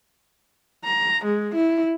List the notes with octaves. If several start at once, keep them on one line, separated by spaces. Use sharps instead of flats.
A#5
G#3
E4